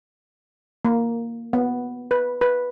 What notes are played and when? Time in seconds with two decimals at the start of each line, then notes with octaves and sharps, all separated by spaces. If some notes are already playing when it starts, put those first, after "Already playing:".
0.85 A#3
1.53 B3
2.11 B4
2.41 B4